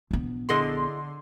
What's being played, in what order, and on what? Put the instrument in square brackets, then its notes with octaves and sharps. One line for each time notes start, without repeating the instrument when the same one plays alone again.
[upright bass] A#1 B3
[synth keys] D3 C6 [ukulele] E4 G#4 D#5